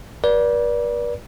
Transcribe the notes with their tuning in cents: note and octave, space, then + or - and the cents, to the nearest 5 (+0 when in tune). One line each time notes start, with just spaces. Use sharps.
B4 -45 D5 -10